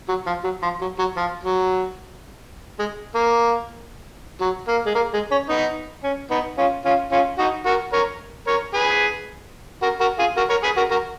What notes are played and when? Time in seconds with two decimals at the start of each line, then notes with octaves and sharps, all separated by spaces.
0.09 F#3
0.27 F3
0.44 F#3
0.63 F3
0.81 F#3
0.99 F#3
1.17 F3
1.44 F#3
2.79 G#3
3.15 A#3
4.41 F#3
4.68 A#3
4.86 G#3
4.95 A#3
5.14 G#3
5.31 C#4
5.49 B3 D#4
6.04 C#4
6.31 B3 D#4
6.58 C#4 F4
6.85 C#4 F4
7.12 C#4 F4
7.38 D#4 F#4
7.66 F#4 A#4
7.93 A#4 C#5
8.47 A#4 C#5
8.74 G#4 B4
9.82 F#4 A#4
10.01 F#4 A#4
10.19 F4 G#4
10.37 F#4 A#4
10.50 A#4 C#5
10.64 G#4 B4
10.77 F#4 A#4
10.91 F#4 A#4